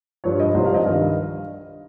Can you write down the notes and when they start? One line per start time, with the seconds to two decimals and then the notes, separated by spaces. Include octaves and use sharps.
0.24 G2 F3 C#5
0.40 D#5
0.54 C2 C3 F3 C5
0.65 F5
0.74 D#5
0.85 G2 D#3 F5